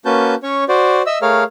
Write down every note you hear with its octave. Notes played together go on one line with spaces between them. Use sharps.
A#3 C#4 F#4 B4 A5 G6
C#4 C#5 C#6
F#4 C5 D5
D#5 E5 E6
A3 G#4 A#4 C#5 F5 F6